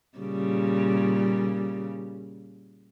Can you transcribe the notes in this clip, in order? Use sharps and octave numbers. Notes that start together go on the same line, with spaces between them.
A#2 C#3 G3